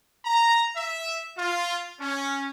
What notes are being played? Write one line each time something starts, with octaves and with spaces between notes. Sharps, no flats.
A#5
E5
F4
C#4